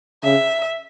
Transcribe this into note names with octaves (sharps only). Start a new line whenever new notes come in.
C#3 E5